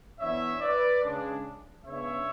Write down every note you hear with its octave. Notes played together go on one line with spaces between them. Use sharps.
E3 B3 D4 C#5 E5
B4 D5
C#3 G#3 D4
C#3 G#3 B3 D4 C#5 E5